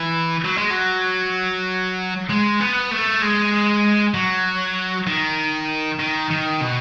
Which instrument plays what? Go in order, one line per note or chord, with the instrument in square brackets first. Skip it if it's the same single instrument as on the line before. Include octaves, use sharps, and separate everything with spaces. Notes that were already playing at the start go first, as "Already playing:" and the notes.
Already playing: [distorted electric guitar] E3
F#3
G#3
F#3
G#3
B3
A3
G#3
F#3
D#3
D#3
D#3
B2